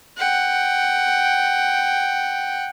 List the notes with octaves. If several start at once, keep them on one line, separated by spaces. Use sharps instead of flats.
F#5 G5